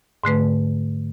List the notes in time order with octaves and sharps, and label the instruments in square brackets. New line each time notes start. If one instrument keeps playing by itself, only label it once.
[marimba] G#2 D3 A3 B4